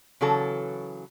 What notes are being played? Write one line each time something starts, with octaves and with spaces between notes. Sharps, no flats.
C#3 E3 F#3 A4